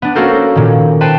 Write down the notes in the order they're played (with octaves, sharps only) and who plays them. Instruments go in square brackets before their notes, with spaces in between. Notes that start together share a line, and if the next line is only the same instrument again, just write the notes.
[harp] B3 D4
A#3 C#4 F#4 A4 A#4 C5
A#2 D#3
B4 C5 G5 A5